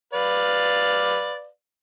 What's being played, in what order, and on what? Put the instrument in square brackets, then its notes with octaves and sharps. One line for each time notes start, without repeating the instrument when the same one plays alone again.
[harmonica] B4 D5 F5